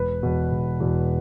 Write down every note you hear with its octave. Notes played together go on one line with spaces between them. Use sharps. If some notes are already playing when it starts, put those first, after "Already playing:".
Already playing: E1 B4
E2 B2
E1
E2 B2